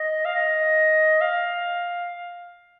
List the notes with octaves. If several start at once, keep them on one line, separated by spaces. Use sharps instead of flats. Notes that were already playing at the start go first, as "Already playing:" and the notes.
Already playing: D#5
F5
D#5
F5